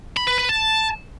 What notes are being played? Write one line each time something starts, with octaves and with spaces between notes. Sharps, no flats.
B5
B4
B4
A5